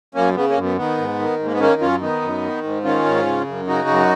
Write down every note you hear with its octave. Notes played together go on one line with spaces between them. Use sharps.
F#2 A#3 C#4
C#3 B3
A#3 C#4
F#2
B3
D#3 B3
G#2
D#3
G#2
A#3
B3
D#3 A#3 C#4
F#2 C#4 F4
D#3 B3 D#4
F#2
D#3
G#2
D#3 C#4 F4
G#2
C#3
F#2
C#3 D#4 F#4
F#2